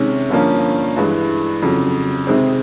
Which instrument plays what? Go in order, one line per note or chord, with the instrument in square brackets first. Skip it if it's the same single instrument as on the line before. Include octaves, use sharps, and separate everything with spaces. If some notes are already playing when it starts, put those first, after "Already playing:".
Already playing: [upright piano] C3 D#3 G#3 C#4
G2 D3 F3 A#3 C#4
G2 E3 G#3
F2 C#3 F#3
C3 D#3 G#3 C4